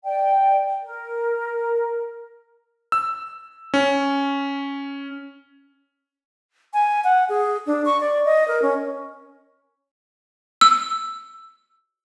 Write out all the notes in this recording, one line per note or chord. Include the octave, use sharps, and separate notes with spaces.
D5 G5
A#4
E6
C#4
G#5
F#5
G#4
D4
C#6
D5
D#5
A#4
C#4
E6